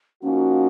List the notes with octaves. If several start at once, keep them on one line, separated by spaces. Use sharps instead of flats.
F3 A#3 C#4 D#4 F#4